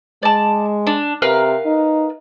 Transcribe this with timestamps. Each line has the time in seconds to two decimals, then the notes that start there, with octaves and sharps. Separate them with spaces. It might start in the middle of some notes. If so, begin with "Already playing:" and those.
0.23 G#3 D5 A5
0.87 D4
1.22 C3 A#4 B4 F5
1.65 D#4